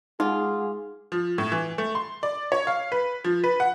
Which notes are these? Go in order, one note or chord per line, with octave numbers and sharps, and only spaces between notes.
G#3 D#4 F4 G#4 F#5 D6
F3
A2
E3
A3
C6
D5
C#5
F5
B4
F3
B4
F#5